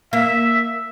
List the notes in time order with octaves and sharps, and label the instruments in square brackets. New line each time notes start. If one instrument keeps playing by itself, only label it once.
[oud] A#3 [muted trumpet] E5